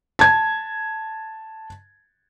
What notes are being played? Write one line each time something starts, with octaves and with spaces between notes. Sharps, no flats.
A5 G#6